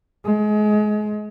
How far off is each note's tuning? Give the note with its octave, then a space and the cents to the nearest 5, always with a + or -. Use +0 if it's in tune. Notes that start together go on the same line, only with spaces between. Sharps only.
G#3 +30